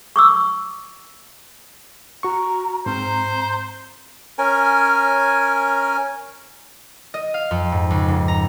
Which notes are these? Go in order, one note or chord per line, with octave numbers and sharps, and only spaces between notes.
C#6 D6 E6
F#4 A#5 C#6
G#2 C4 C5 A#5
C#4 A#4 G#5
D#5
F5
F2
G#2
C#2
G#2
A#5